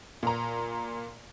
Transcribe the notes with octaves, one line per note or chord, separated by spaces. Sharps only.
A#2 A#5